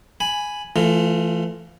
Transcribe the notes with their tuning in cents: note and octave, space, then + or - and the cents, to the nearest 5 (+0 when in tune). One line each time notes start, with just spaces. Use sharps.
G#5 +0 B5 +0
E3 +30 A3 +5 F4 +0